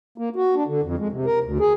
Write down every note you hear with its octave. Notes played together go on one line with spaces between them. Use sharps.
A#3
F#4
D4
D3
F2
G#3
C3
A#4
D2
G#4